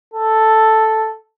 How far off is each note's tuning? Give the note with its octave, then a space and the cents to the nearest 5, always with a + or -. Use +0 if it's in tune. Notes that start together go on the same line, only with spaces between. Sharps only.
A4 +0